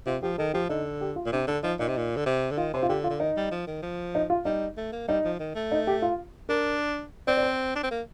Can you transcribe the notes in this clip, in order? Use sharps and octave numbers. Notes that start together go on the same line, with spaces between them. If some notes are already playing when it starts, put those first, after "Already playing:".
C3 F4
F3 G4
D#3 A4
F3 G4
D3 D#4
G4
F4
A#2
C3 D4
D3 D4
F3 D#4
A#2 D#4
C3
A#2
D3
C3
D3
D#3 F4
C3 C5
F4
D3 G4
F4
D3
D#3 D#4
G3
F3
D#3
F3
D#4
F4
G3 D#4
A3
A#3
G3 D#4
F3
D#3
A3
D#4
G4
F4
D4 A#4
C4 D5
D5
C5
D4
C4
A#3